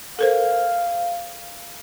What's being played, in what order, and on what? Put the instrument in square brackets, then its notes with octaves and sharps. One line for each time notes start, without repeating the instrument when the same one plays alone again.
[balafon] A4 A#4 C5 [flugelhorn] F5